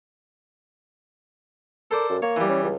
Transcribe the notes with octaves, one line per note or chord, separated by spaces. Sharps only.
A4 A#4 C5 D5
F#2
A#3 C#5
E3 G3
C#4
C#2